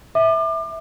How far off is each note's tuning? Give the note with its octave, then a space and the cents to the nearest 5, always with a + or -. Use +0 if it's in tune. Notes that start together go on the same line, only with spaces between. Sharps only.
E5 -15 D6 +35